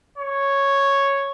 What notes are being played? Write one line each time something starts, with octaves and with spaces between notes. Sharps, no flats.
C#5